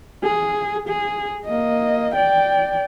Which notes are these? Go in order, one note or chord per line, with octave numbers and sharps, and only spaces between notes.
G#4
G#4
A#3 D#5
D5 G5